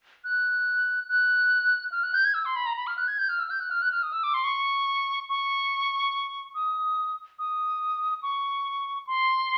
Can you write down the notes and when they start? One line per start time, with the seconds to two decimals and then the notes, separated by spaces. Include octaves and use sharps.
0.24 F#6
1.09 F#6
1.92 F6
2.03 F#6
2.14 G6
2.25 G#6
2.34 E6
2.45 C6
2.56 B5
2.66 A#5
2.77 B5
2.87 F6
2.98 F#6
3.08 G#6
3.19 G6
3.29 F6
3.39 E6
3.50 G6
3.60 F#6
3.71 F6
3.82 F#6
3.92 F6
4.03 D#6
4.13 E6
4.24 D6
4.34 C6
4.44 C#6
5.29 C#6
6.55 D#6
7.39 D#6
8.23 C#6
9.07 C6